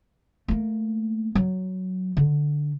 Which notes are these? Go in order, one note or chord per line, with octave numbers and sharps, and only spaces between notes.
A3 A#3
F#3
D3